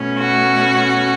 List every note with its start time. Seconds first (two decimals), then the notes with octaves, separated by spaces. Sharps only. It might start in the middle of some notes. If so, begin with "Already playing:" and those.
Already playing: B2 A3 C#4
0.19 F#4